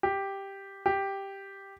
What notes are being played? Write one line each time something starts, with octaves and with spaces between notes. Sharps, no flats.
G4
G4